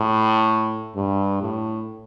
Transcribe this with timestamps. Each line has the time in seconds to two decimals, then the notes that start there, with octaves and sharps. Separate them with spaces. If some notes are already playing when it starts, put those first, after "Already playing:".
Already playing: A2
0.96 G2
1.42 A2